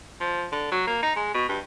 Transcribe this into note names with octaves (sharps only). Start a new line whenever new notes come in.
F3
D3
F#3
A#3
D#4
G#3
B2
G2